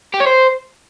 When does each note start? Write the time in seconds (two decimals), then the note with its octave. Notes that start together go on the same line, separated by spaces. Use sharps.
0.14 G4
0.20 C#5
0.27 C5